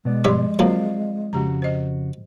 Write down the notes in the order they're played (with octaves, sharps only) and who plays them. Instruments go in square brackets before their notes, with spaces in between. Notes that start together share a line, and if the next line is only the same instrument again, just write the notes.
[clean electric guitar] B2 B3 D5 [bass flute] G#3
[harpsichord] G2 C#5 E5 [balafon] F3 C6
[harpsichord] D3 F#3 A#3 [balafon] C4 F4 C5 [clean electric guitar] D5 F5
[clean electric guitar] F2 C#3 F#4 [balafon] G4 A#5
[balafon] C5 D#5